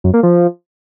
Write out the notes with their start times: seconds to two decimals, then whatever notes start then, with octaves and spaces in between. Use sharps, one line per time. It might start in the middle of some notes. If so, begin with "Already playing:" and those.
0.04 F#2
0.14 A#3
0.23 F3